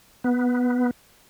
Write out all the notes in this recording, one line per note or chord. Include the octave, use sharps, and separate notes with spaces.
B3